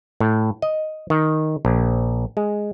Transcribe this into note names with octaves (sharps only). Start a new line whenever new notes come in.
A2
D#5
D#3
A#1
G#3